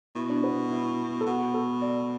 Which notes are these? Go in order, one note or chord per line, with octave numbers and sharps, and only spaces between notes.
B2 E4
D4
B3
E4
A4
B2 F#4
A4
D5